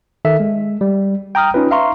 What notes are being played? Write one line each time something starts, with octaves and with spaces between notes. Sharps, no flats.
D#3 A4 E5
G#3
G3
G5 A#5 D#6 F6
C#4 D#4 F4 B4
E5 F5 A#5 C6 C#6